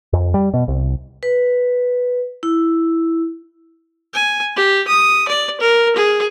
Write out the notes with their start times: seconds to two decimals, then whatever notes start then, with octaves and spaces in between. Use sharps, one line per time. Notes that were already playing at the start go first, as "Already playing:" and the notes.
0.13 F2
0.34 G3
0.54 B2
0.68 C2
1.23 B4
2.43 E4
4.14 G#5
4.56 G4
4.88 D#6
5.28 D5
5.61 A#4
5.96 G#4